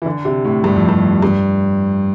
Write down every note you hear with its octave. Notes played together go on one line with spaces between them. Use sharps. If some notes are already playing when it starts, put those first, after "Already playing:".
E3
D3
C3
A2
G2
F2
G2
G2